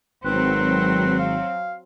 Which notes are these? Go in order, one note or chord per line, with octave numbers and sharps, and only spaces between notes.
G#1 F#3 C4 B4
F5